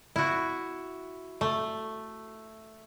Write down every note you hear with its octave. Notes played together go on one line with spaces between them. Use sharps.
E4 F#4
A3